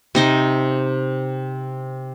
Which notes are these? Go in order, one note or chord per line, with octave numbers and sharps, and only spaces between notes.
C3 D#4 C5